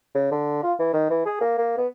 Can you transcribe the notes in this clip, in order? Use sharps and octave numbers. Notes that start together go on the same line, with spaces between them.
C#3
D3
F4
E3
D#3
E3
G#4
A#3
A#3
B3